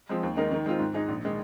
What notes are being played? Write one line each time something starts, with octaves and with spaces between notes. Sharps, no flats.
F3 G#3 C4
D#2
D#3 G#3 D#4 A#4
D#3
G#3 C4 F4 C5
G#2
G#3 D#4 G#4
A#1
D#3 G#3